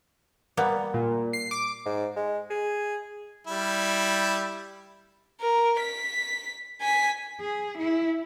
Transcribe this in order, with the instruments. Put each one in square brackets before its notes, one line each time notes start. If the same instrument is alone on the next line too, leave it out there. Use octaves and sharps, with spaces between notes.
[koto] G3 A#3 B3
[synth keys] A#2
C7
D6
[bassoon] G#2
G#3
G#4
[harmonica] G3 E4
[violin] A#4
B6
G#5 B6
[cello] G#4
E4